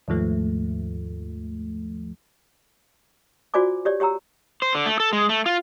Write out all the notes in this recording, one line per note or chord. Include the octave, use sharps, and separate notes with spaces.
D#2 G#2 F3 A3
F4 F#4 C5 D5 G#5 D6
G4 C#5 D5
G4 C#5 G5 A#5 E6
C5
D3
A3
A4
G#3
A3
F4